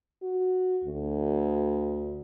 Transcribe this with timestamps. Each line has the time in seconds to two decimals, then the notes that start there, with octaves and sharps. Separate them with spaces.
0.22 F#4
0.84 D2